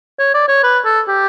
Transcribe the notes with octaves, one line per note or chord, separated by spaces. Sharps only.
C#5
D5
C#5
B4
A4
G4